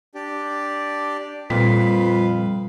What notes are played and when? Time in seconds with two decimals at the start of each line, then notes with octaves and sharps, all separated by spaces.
0.15 D4 G4 D5
1.50 F2 A#2 G3 B4 F5